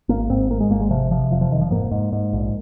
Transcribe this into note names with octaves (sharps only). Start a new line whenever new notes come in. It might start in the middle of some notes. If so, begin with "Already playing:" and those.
G#1 A#3
G#2 C4
G#2 A#3
G#3
G#1 A#3
G#3
C3 F3
C3 F3
F1 F3
F3
F1 D#3
F3
G#2 A#3
G#2
G#2
A#1